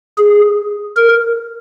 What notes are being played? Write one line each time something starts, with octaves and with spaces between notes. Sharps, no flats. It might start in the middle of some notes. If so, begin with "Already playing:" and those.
G#4
A#4